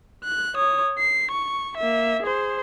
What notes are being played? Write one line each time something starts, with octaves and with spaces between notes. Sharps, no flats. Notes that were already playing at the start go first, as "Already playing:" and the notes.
F#6
C#5 D#6
C7
C#6
A#3 E5
G#4 C5